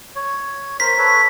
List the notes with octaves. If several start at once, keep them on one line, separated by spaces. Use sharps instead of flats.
C#5
A#4 C5 B6
A4 B4 C#5